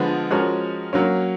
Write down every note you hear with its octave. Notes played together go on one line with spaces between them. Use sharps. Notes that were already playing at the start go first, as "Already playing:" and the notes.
Already playing: D3 F3 G#3 B3
F3 G#3 C#4 F#4 A#4
F#3 A#3 C#4